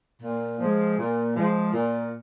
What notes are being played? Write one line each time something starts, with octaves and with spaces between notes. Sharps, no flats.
A#2
F3 G#3
A#2
F3 G#3
A#2